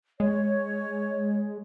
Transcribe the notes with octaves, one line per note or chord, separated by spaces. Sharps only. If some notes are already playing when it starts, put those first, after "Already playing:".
G#3 C#5